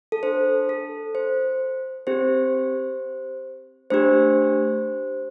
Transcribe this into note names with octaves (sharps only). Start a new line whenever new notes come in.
A4
D4 A4 C5
A4
C5
C4 G4 C5
A3 D4 G4 C5